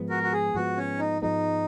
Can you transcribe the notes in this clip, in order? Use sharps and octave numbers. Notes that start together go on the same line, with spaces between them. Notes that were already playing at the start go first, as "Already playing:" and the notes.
Already playing: G#2 F3 G#3 B3
F#4 A#4
F#4
G#4
G#2 F3 G#3 B3 F#4
C#4
D#4
G#2 F3 G#3 B3 D#4